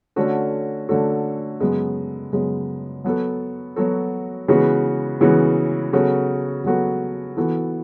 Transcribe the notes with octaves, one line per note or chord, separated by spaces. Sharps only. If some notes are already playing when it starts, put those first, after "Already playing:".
D3 A3 C#4 F#4 A4
D3 A3 C#4 F#4 A4
F#2 C#3 G#3 B3
F#2 C#3 G#3 B3
F#3 B3 F#4 A4
F#3 B3 F#4 A4
C#3 E3 G#3 B3 F#4
C#3 E3 G#3 B3 F#4
C#3 F#3 B3 F#4 A4
C#3 F#3 B3 F#4 A4
E3 B3 F#4 A4